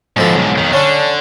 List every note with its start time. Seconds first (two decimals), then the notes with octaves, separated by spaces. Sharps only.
0.17 G#2 B2 D3 F3 A4
0.35 B1
0.58 F2 D#3
0.73 D3 C#4 D4